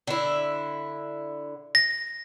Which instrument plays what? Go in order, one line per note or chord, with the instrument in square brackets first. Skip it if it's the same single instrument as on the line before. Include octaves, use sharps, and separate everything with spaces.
[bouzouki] D3 E4
[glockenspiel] A#6